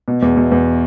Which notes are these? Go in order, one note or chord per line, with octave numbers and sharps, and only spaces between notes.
B2
E2
B2
E2